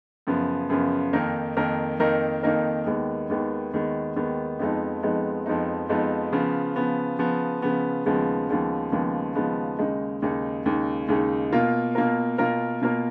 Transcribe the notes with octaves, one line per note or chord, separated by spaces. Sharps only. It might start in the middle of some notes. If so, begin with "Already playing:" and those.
F#2 C#3 F3 B3
F#2 C#3 F3 B3
F2 D#3 A#3 D#4 A#4
F2 D#3 A#3 D#4 A#4
F2 D#3 A#3 D#4 A#4
F2 D#3 A#3 D#4 A#4
D#2 D#3 G#3 B3
D#2 D#3 G#3 B3
D#2 D#3 G#3 B3
D#2 D#3 G#3 B3
F2 F3 G#3 B3 D#4
F2 F3 G#3 B3 D#4
F2 F3 G#3 B3 D#4
F2 F3 G#3 B3 D#4
C#3 F3 B3
C#3 F3 B3
C#3 F3 B3
C#3 F3 B3
D#2 C#3 F3 G#3 B3
D#2 C#3 F3 G#3 B3
D#2 C#3 F3 G#3 B3
D#2 C#3 F3 G#3 B3
D#2 C#3 G#3 D#4
D#2 C#3 G#3 D#4
D#2 C#3 G#3 D#4
D#2 C#3 G#3 D#4
B2 A#3 F4 A#4
B2 A#3 F4 A#4
B2 A#3 F4 A#4
B2 A#3 F4 A#4